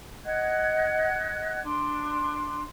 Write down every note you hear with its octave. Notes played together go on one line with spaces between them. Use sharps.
D#5 F#5 F#6 G#6
D4 C6